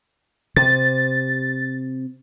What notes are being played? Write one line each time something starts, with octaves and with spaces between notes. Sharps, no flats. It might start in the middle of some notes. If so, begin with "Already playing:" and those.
C3 A6